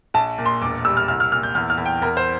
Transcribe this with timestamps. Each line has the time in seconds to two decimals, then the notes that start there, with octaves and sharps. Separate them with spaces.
0.14 A#1 A5
0.38 A#2
0.46 C6
0.62 E1 D6
0.85 G3 E6
0.97 F6
1.08 C2 F6
1.20 F6
1.31 A#2 F6
1.43 G6
1.55 E2 F6
1.70 F6
1.78 E2
1.86 G5
2.02 E2 A#4
2.17 C5